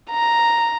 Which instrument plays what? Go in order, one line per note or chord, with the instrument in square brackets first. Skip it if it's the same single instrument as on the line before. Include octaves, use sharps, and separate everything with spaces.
[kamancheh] A#5